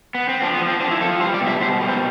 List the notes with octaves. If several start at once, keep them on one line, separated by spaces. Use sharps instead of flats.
B3
C4
F3 D4
B3
F3
C4
F3 D4
E4
F3 A4
G3 C5
D5
B2
E5
B2 C5
G3
C5